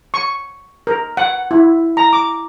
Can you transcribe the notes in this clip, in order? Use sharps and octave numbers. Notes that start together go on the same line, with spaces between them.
C#6
A#4
F#5
E4
A#5
D6